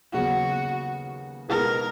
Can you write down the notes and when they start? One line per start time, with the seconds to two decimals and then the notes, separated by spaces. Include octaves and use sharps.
0.13 D#2 C#3 F#3 B3 F#4
1.49 B2 G#3 D#4 G#4 A#4 B4